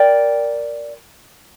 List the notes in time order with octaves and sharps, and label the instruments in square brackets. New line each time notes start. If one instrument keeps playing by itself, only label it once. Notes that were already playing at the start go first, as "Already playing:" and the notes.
Already playing: [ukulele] A#4 D5 G5